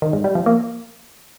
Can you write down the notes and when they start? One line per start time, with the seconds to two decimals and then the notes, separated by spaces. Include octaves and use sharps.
0.02 D#3
0.13 G#2
0.24 G3
0.35 F3
0.46 A#3